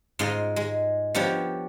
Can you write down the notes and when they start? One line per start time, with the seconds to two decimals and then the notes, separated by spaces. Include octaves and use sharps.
0.19 G#2 F4 D#5 C6
0.56 G#3
1.15 F3 B3 D4 G4 C#5